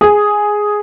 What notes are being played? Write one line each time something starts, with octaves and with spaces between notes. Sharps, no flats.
G#4